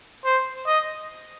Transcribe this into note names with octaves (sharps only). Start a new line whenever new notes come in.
C5
D#5